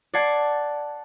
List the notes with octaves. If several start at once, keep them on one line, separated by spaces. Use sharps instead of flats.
D5 F#5 A5 G#6 C7